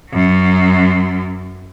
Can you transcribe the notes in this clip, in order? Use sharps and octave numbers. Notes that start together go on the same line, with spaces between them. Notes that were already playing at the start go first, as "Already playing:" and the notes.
F#2 F#3